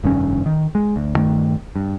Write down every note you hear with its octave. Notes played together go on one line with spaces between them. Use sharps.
F1 G2 D#3 C#4
D#3
G#3
D2
G2 D#3 A3
G2